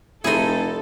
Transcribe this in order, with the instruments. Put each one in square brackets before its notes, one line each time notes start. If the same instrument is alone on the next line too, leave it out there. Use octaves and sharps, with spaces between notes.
[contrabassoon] F1 [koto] D#4 G#4 [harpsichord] E4 B5 C6 [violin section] A4